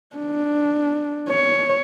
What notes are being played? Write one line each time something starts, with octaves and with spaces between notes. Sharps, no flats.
D4
C#5